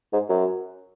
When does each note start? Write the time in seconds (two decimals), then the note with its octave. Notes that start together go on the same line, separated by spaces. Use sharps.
0.13 G#2
0.29 F#2